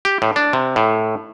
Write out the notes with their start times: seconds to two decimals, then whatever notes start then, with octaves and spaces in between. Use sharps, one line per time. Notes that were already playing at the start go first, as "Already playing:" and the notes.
0.05 G4
0.22 A2
0.36 D4
0.53 C3
0.76 A2